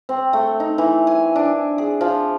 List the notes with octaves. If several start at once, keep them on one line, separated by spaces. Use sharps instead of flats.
C4
A3
D#4
E3
G#5
D4
G#4
F3